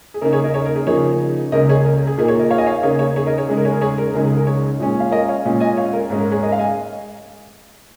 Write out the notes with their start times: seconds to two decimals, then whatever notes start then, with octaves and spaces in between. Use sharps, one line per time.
0.14 G#4
0.21 C#3 A#3 D#4 A#4
0.33 G#4 C#5
0.44 A#4 D#5
0.54 G#4 C#5
0.65 A#4
0.76 G#4
0.87 C#3 F3 A#3 D#4 G#4 C#5
1.52 C#2 C#3 A#3 A#4 D#5
1.69 G#4 C#5
1.85 A#4
1.96 A#4
2.07 G#4
2.18 A#2 A#3 D#4 G#4
2.28 G#4 C#5
2.39 A#4 D#5
2.51 C#5 F5
2.58 D#5 G#5
2.66 C#5 F5
2.83 C#3 A#3 D#4 G#4 C#5
2.99 G#4 C#5
3.16 G#4 C#5
3.26 A#4 D#5
3.38 G#4 C#5
3.48 C#3 G#3 D#4 G#4
3.57 A#4
3.65 G#4 C#5
3.73 A#4
3.81 G#4 C#5
3.98 A#4
4.13 C#2 C#3 G#3 D#4 A#4
4.24 G#4
4.36 A#4
4.47 G#4 C#5
4.80 A#2 G#3 C#4
5.00 F5
5.12 A#4 D#5
5.28 C#5 F5
5.45 A#2 G#3 C#4
5.60 D#5 G#5
5.77 C#5 F5
5.93 A#4
6.10 G#2 G#3 C#4
6.21 A#4
6.32 G#4 C#5
6.42 A#4 D#5
6.52 F5
6.59 D#5 G#5